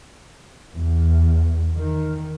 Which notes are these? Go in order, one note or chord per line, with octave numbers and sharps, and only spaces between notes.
E2
D#3